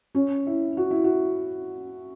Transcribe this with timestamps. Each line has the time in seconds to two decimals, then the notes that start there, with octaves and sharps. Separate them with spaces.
0.15 C#4
0.47 E4
0.77 F#4
0.91 E4
1.04 F#4